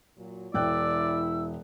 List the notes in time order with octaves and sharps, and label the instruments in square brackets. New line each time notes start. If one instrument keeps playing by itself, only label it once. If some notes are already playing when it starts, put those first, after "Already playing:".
[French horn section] A#2 F#3
[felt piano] E1 G5 F#6 [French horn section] E4 [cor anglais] D5 [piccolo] E6